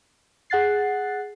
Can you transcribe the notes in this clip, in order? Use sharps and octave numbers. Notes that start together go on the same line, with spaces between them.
G#4 F#5 F#6 A6 C7